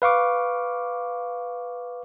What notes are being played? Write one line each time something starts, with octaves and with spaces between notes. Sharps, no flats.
B4 F5 C#6 D6